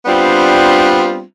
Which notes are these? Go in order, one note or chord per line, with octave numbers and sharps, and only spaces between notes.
G3 B3 C4 D4 F4